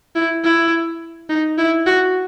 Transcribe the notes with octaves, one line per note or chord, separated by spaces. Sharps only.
E4
E4
D#4
E4
F#4